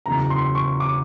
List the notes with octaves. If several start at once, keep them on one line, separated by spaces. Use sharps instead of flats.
F#1 E2 C#3 F#3 A#5
C6
C#6
D6